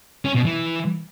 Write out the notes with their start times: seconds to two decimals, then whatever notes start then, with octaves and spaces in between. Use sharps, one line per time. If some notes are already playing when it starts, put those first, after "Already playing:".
0.25 C#4
0.35 B2
0.45 E3